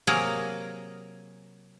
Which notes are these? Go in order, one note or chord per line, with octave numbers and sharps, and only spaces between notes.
C3 F#3 A#3 G#4 A#4